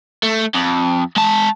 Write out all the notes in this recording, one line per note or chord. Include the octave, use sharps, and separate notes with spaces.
A3
F2
G#3 A5